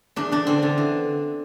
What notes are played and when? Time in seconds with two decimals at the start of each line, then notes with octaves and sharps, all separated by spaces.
0.16 E2 D4
0.32 E2 D4
0.47 D3 C4
0.62 D3
0.78 E3